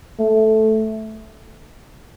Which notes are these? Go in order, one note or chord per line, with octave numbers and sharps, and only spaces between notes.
A3